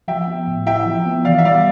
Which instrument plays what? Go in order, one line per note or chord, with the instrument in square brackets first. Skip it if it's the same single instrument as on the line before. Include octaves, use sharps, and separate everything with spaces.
[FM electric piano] F3 [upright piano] E5 G5
[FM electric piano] B3
A2
[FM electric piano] E4 [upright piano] E5 G5
[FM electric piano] F3
B3
[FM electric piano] E3 [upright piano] D5 F5
[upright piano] E5
[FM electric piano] G3 [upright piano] D5 F5